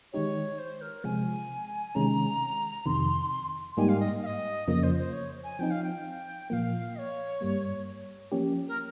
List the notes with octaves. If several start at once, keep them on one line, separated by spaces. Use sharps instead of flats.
D#3 G#3 D#4 G4 C#5
C5
A#4
C3 F3 G#3 G#5
C3 D#3 G#3 C#4 A#5
F2 C3 D#3 C6
G#2 G3 A#3 D#4 G4 G#5
F5
D#5
F5
D#5
F2 C#3 F3 A#3 D#5
C5
C5
C#5
G#5
F3 C4 D#4 G5
F5
G5
A#2 F3 A#3 F5 G5
D#5
C#5
G2 G3 A#3
F3 A#3 C#4 G4
A#4